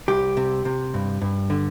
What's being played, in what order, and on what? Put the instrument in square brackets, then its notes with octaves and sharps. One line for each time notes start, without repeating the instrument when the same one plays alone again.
[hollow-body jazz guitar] C2 G4
C3
C3
G2
G2
D3